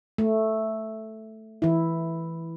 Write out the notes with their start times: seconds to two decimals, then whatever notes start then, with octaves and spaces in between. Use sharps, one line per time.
0.18 A3
1.62 E3 E4